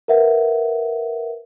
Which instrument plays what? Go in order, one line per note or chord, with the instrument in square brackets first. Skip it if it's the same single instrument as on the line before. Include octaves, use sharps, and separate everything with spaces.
[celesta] A#4 B4 E5 F#5